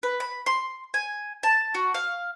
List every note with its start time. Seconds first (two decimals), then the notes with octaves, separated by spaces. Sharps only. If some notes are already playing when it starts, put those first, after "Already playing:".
0.03 B4
0.20 B5
0.46 C6
0.94 G#5
1.43 A5
1.75 F#4
1.94 F5